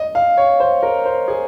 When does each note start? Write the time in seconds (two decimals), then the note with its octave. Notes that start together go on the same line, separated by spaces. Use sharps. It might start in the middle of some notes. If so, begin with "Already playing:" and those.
Already playing: D#5
0.15 F5
0.37 C#5
0.60 C5
0.83 A#4
1.06 C5
1.28 G#4